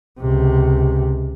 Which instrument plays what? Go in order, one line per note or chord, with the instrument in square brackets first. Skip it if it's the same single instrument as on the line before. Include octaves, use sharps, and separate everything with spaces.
[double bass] C#2 C3